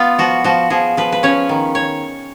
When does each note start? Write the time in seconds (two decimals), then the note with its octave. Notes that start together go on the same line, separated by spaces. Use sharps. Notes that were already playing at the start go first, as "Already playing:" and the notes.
Already playing: B3 F4
0.18 F3 F#4
0.44 F3 F#4
0.70 F3 G#4
0.97 F3 B4
1.12 B4
1.23 C#4 C#5
1.49 D#3
1.75 C#5